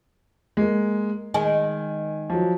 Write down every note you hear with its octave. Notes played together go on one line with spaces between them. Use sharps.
G#3 A#3
D#3 G#3 G#5
F3 F#3